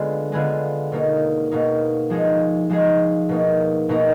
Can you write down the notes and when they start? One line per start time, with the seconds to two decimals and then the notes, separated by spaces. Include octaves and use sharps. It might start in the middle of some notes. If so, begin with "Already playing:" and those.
Already playing: D3 G#3 B3 F4 G#4
0.32 D3 G#3 B3 F4 G#4
0.92 B2 A#3 D#4
1.51 B2 A#3 D#4
2.10 F3 G#3 D#4 G#4
2.70 F3 G#3 D#4 G#4
3.29 B2 A#3 D#4
3.89 B2 A#3 D#4